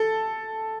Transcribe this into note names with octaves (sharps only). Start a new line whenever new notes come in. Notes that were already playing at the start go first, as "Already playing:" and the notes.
Already playing: A4